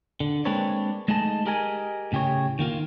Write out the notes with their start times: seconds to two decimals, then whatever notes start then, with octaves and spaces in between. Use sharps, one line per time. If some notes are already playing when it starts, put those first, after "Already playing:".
0.20 D3
0.45 G#3 A#3 C4 D4 B4 C#5
1.08 G#3 A3 D#4 G#4 D#5 A5
1.45 G4 G#4 A#4 D#5 F#5 G#5
2.12 A2 C#3 G4 G#4 C#5
2.59 D#3 A#3 F4